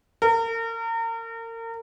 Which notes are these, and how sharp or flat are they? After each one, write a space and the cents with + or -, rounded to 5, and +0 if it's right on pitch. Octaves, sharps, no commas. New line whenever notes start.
A#4 -35